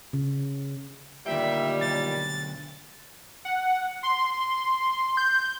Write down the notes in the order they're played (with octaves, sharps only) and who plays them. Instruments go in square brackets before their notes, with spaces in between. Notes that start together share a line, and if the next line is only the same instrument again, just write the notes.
[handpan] C#3
[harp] D2 G5 [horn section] A#2 D#3 G3 [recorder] E5
[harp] B1 [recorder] A6
[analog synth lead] F#5
C6
G6